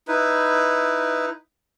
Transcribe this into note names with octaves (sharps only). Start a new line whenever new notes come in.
D#4 E4 B4